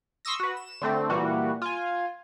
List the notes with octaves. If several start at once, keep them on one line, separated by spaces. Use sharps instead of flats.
C6 C#6 D#6 E6 A#6
F#4 B4
E7
D3 A3 C4
A#2 E3 G3 F#4
F4 G#5